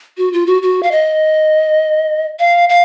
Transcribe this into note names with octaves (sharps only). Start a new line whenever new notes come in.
F#4
F4
F#4
F#4
F5
D#5
F5
F5